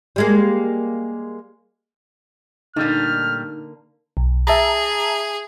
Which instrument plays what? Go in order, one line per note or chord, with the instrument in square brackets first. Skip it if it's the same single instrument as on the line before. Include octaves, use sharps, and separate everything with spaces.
[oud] G3 G#3 A#3
[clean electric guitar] A#2 G3 A3 [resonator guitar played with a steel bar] D3 A#3 [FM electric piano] D#4 [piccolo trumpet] F6
[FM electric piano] B1
[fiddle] G#4 [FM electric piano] E5 A5 A#5